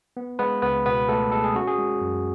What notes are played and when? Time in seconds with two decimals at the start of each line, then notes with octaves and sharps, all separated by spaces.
0.17 B3
0.39 G#3 B3 B4
0.62 C#2 B3 B4
0.86 B2 B3 B4
1.09 A3 B3 A4
1.32 G#3 A4
1.44 G#4
1.55 C#4 F#4
1.67 G#4
1.78 G#3
2.01 F#2